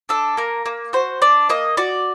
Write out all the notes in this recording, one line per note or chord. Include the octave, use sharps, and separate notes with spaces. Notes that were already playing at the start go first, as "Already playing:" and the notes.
D4 A4
A#3 A#4
A#3
F#4 C5
D4 D5
A#3 D#5
F#4 D5